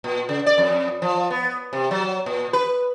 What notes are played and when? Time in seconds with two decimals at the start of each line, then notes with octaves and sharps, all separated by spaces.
0.04 A#2
0.29 C#3
0.46 D5
0.58 F2
1.02 F3
1.30 B3
1.73 C3
1.91 F#3
2.26 A#2
2.53 B4